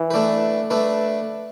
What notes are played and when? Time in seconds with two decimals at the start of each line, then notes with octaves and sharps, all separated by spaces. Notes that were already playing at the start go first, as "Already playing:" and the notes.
Already playing: E3
0.10 A3 D4 B4
0.70 A3 D4 B4